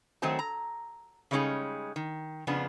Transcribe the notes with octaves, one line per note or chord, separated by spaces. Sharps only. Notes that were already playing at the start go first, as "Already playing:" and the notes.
D#3 F#3 A3 C4 C5 A5
A#5
C#3 G3 G#3 C#4 D#4 G#4
D#3
F2 C#3 F3 B3 D4